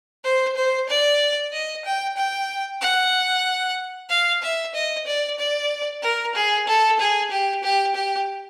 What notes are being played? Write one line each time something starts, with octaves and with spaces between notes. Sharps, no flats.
C5
C5
D5
D#5
G5
G5
F#5
F5
E5
D#5
D5
D5
A#4
G#4
A4
G#4
G4
G4
G4